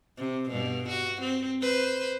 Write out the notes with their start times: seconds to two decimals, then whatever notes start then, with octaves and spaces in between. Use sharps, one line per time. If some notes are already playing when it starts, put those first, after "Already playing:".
0.17 C3
0.50 G2 B2
0.89 F#4
1.21 C4
1.62 B4 C5